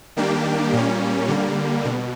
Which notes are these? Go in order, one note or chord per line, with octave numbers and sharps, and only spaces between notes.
D#3 G3 A#3 D4 G4
A#2 G3 A#3 C#4
D3 G3 A#3
B2